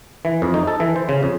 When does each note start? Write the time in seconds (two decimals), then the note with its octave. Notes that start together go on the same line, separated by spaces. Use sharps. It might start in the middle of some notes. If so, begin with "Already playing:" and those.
0.25 E3
0.42 F2
0.54 D#4
0.67 A4
0.80 E3
0.96 C5
1.09 C#3
1.23 F2